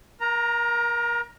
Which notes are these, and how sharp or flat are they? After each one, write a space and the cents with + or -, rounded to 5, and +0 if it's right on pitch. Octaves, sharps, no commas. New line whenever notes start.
A#4 +30 A#5 +0